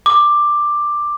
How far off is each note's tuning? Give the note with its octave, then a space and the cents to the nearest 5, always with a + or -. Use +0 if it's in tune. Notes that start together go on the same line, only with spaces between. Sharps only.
D6 +10